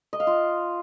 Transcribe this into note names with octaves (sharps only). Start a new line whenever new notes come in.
D#5
F5
F4